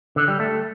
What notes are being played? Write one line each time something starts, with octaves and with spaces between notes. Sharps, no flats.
D3
G3
A3